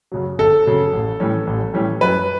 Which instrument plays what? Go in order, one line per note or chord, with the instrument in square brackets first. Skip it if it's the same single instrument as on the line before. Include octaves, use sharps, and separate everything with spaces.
[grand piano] F#2 C#3 F#3
G1 A4
F#2 C#3 F#3
A1
A2 E3 G3 C#4
A1
A2 E3 G3 C#4
F#2 B4